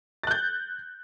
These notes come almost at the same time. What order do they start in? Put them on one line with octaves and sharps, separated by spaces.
A6 F#6 G6